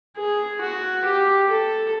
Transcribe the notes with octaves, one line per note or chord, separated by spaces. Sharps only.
G#4
F#4
G4
A4